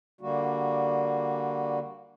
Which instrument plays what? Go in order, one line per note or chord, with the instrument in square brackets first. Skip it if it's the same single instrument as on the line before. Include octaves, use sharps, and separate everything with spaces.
[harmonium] D3 G3 A#3 F#4